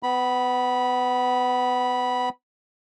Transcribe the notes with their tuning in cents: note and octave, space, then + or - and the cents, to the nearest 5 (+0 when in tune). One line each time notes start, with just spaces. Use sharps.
B3 +25 B5 -15